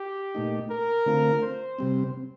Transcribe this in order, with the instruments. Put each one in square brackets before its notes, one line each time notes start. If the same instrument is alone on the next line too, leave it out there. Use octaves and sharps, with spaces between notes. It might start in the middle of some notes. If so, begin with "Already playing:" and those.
Already playing: [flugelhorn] G4
[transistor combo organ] A#2 A3 D#4
[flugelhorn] A#4
[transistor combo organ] D3 A3 C4 F4
[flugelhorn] C5
[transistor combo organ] C3 G3 C4